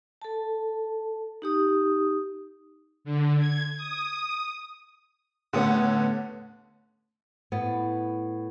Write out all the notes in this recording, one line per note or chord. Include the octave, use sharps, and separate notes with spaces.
A4 A5
D#4 G4 D#6
D3
G#6
D#6
A2 D3 B3 C#4 G4 D#6
A2 B3